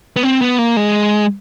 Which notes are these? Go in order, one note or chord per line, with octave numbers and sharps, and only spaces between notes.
B3
C4
B3
A#3
G#3